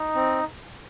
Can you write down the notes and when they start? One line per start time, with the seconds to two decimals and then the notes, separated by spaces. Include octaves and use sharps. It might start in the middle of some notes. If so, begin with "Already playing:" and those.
Already playing: D#4
0.15 C4